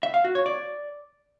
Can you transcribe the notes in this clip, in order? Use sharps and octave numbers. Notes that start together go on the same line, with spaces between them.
E5
F5
F#4
C#5
D5